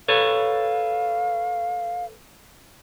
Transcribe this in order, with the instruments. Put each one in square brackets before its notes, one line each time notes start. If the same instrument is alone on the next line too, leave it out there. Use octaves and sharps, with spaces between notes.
[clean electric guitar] A4 B4 C#5 [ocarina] F5